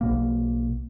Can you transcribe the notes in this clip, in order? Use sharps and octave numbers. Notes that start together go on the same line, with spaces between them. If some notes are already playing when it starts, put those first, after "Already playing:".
B1 B2 A#3